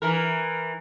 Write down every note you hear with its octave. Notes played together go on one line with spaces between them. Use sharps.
E3 A#4